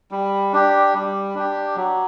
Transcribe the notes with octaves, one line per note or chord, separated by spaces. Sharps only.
G3
D4 G4
G3
D4 G4
F#3